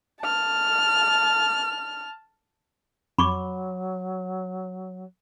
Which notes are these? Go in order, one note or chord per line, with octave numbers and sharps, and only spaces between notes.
A5 F6
F2 F#3 B5 C#6 D6